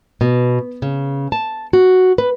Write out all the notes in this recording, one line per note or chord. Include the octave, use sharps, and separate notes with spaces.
B2
C#3
A5
F#4
B4